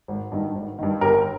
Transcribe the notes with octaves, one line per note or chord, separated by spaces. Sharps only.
G#1
G2 D#3
G#1
G2 D#3
G1 G4 A#4